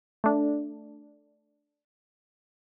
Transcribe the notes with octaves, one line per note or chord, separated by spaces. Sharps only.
A3 D4